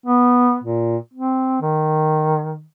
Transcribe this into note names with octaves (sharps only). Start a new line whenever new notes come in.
B3
A#2
C4
D#3